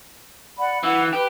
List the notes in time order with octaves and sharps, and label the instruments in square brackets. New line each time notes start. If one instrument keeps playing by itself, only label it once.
[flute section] D5 F#5 B5
[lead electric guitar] E3 [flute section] F#5
[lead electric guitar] G4 [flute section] B4